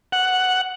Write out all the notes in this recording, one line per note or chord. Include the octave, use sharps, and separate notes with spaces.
F#5